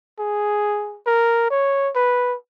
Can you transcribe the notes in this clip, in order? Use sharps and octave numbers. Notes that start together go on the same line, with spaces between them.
G#4
A#4
C#5
B4